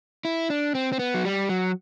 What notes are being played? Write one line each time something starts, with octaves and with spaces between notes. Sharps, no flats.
E4
D4
C4
C4
B3
F#3
G3
F#3